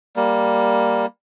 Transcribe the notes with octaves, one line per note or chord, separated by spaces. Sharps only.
G3 A#3